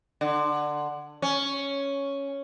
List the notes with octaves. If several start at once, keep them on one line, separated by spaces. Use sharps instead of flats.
D3
C#4